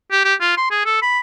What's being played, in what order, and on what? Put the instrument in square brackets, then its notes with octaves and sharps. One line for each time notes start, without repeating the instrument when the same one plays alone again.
[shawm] G4
G4
F4
C6
G#4
A4
B5